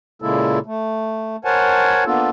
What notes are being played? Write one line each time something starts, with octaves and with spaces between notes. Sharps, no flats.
A#2 C#3 G#3 A#3 E4 A4
A3
A#4 C5 C#5 F#5 G#5 A5
A#3 B3 D4 F4 A4